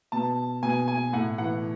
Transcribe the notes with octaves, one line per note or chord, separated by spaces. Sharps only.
B2 A5
B2 G#5
G#5
A2 F#5
E3 F#5